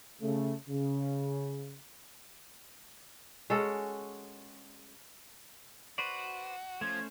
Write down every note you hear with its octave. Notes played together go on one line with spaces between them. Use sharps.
C#3 A3
C#3
G#3 C#4 F#4 A4
F#4 B4 C5 D5
F3 A3 C#4 C5 G#6